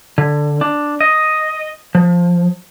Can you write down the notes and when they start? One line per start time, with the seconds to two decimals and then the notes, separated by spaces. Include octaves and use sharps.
0.18 D3
0.61 D4
1.01 D#5
1.95 F3